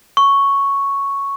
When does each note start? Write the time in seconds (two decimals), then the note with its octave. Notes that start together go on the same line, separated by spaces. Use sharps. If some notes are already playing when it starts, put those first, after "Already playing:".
0.17 C#6